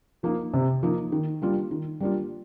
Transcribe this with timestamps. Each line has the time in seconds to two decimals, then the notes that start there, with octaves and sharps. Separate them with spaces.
0.23 F3 A#3 D#4
0.54 C3
0.83 F3 A#3 D#4
1.12 D#3
1.42 G3 A#3 D4 F4
1.71 D#3
2.00 G3 A#3 D4 F4